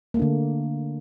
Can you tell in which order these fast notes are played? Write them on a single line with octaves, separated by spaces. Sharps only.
A#3 A3 D4 D3